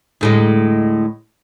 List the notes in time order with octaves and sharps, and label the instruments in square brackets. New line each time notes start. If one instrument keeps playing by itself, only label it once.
[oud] D2 A2 G#3